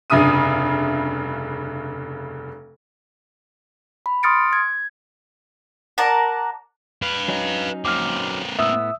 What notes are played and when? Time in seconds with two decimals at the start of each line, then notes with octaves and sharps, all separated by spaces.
0.10 F1 G2 C#3 E5 D#6 D#7
4.06 B5
4.23 C6 D#6 F6 A6 C#7 D7
4.53 G#6
5.98 A#4 D5 F#5 A5
7.02 B4 F5
7.28 F#3 C#4 D#4
7.85 A#3 C4 D6 F6
8.59 A2 B3 E5 D#6 E6